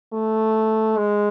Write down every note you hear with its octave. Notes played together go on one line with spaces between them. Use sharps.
A3
G#3